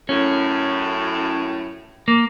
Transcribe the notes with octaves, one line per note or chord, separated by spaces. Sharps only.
F#2 A2 C#4
A#3